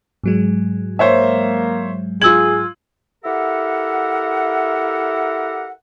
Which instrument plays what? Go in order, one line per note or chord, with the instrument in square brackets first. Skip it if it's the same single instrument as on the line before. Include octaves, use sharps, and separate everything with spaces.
[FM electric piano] G#2 F#3 G#3
[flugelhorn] A#3 [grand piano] C5 C#5 E5
[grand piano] F4 F#7 [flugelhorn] G#4 [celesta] E6 G#6
[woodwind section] E4 G4 A4 A#4 E5 F#5